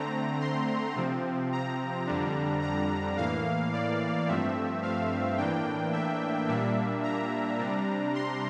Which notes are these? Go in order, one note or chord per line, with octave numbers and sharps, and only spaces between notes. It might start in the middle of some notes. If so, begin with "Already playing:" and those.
Already playing: D3 A3 C4 A#5
C6
C3 F3 C4
A#5
F2 D3 G3 D4
A#5
A2 E3 A#3 F5
D5
G2 F3 A3 C4 E5
F5
A2 E3 A#3 D4 G5
E5
A#2 G3 A#3 D4 E5
A#5
C3 G3 D4
C6